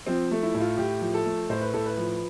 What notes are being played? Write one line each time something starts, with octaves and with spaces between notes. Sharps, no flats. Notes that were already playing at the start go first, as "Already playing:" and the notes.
F3 C4
A3
E4
A2
F4
A2 G4
F3
A4
A3
A2 C5
B4
A2 A4
B4
F3